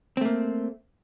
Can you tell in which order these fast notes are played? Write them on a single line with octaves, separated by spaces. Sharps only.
C4 A3 A#3